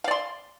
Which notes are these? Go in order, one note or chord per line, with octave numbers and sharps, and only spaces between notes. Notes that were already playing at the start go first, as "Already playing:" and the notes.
D5 F5 C6